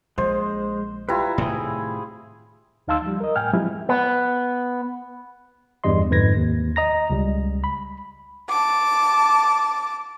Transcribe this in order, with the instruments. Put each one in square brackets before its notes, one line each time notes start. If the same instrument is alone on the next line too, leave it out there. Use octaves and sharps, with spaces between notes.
[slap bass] A#1 [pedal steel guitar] G#3 [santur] C5
[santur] G3 E4 F4 [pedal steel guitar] B4 A#5
[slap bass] A2 C3 D#3 [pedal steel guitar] G#4
[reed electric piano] D2 D#4 F5 A5 C6 E6
F3 G3
A#4 D#5
A2 G5 G#5 F6
F3 F#3 G#3 C4 E4 G4
[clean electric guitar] B3
[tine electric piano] E2 G2 G3 D#5 C6
F2 G#2 D3 B4 G#6 A#6
D#2
D#5 A#5 A#6
C#2 G3
B5
[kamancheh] A5 D6